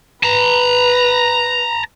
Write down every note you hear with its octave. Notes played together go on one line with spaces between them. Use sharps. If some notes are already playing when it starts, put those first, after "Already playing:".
B4 A5 A#5